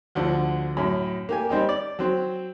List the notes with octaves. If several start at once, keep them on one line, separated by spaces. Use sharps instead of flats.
D2 D3 F3
F#2 A2
A#3 G4 G#5
G3 C4 D#4 G4
D5
F#3 C4